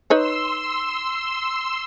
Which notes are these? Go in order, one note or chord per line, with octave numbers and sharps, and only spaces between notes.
D#4 B4 C#5 C6 E6